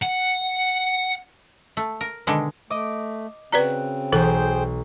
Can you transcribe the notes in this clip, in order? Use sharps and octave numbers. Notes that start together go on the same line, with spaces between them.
F#5
A3
A#4
B2 D3 D#3 G#3
A3 D#5 D6
C#3 C4 F#4 B4 D5 A#5 F#6
B1 E3 G#4 A4 C5 G5